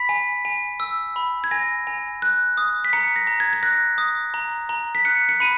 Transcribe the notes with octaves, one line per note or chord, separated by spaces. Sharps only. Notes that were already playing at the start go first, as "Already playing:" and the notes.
Already playing: B5 B6
G#5
G#5
E6
B5
G#6
G#5 A#6
G#5
F#6
D#6
B6
A#5 C#7
A#6
A#5
G#6
G#6
F#6 A#6
D#6
A#5
A#5
B6
F#6 C#7
C#7
B5 D#7